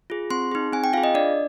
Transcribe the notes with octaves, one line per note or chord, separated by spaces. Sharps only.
F4 G#4
C4 C6
D#4 G#4
C4 G#5
G5
F4 G#4 F5
D#5
D4 D5